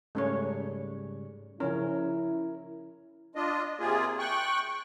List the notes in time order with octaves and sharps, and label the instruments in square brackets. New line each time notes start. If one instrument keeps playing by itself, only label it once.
[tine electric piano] G#2 C#3 G3 [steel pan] A3 C#4 C#5
[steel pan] C#3 F3 C#4 [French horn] E4 [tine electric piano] A#4
[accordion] D4 F4 D#5
C3 A#3 F4 G#4
G5 C#6 F#6